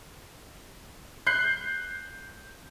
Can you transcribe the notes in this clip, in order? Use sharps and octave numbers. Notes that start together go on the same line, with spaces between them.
F#6 G6 C7